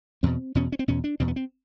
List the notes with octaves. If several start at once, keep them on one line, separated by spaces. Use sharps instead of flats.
E2 B2 C4
E2 B2 C#4
C#4
C4
E2 B2 C#4
D4
E2 B2 C4
B3
C4